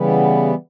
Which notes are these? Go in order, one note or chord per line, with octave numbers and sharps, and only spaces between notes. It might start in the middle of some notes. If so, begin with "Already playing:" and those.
Already playing: C#3 E3 G3 B3